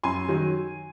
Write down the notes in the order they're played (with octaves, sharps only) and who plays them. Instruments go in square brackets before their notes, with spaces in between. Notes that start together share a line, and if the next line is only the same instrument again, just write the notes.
[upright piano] F#2 G#5 C6
D#3 F#3